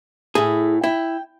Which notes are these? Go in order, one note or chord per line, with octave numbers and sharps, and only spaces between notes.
A2 E4 G#4
E4 G5